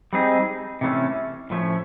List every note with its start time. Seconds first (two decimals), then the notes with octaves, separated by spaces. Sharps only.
0.13 G3 C4 D#4 G#4
0.81 C3 E3 A3 C#4
1.50 A2 F3 A3 C#4